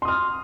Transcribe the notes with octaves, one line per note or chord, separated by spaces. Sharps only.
C6 D#6 F6